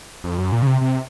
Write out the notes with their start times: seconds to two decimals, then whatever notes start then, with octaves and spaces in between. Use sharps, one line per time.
0.24 F2
0.38 F#2
0.52 A#2
0.62 C#3
0.67 C3
0.81 C3